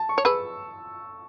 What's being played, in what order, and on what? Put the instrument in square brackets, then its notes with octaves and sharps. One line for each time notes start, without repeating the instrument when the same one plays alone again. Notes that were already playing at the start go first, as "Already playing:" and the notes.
Already playing: [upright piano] A5
C#6
[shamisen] C#5
[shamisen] G#4 B4 [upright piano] E6